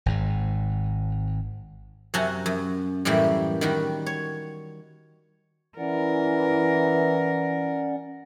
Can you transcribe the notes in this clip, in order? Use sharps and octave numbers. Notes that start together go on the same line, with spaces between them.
G#1 G#2
F#2 C3 C#4 F#4 A5 A#5
F#2
F#2 A2 E3 G3 A#3
D#3 G3 F#4
C#5
E3 C#4 A#4 D5 F#5